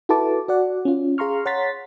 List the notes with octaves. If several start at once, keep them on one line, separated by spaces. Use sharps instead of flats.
E4 F#4 A4 B4 A5 D6
F#4 D5 F#5
C#4 F4
G#4 F5 A#5 C6 C#6 F6
C#5 F#5 A#5 C6 A6 B6